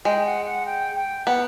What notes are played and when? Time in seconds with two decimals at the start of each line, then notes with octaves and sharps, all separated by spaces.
0.05 G#3 G5
0.25 F#5
0.46 F#5
0.66 G5
0.96 G5
1.26 B3 F#5